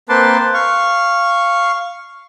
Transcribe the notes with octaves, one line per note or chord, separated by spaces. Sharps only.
A#3 C4 B4 A5 C6 D6
F5 C#6